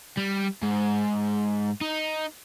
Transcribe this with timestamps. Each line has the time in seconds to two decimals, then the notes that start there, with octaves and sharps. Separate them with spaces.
0.17 G3
0.63 G#2
1.81 D#4